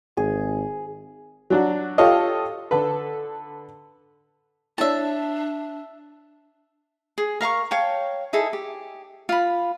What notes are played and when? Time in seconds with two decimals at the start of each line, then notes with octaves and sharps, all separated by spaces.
0.17 G#1 G#4
1.50 F#3 D4 F#4
1.98 F4 G4 A4 C#5 D#5 F5
2.71 D3 A4 B4
4.78 D4 E4 C#5 D5 E5 A5
7.18 G#4
7.41 A#4 F5 A#5 C#6
7.71 C#5 F5 G5 A5
8.33 D#4 E4 G#4 A4
8.53 G4
9.29 F4 B5